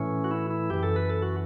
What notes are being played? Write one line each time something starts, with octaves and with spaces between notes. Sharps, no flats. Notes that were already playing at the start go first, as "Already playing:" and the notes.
Already playing: A2 E3 C#4
F#4
E4
E4
F#2 E3 G4
A4
B4
A4
F#4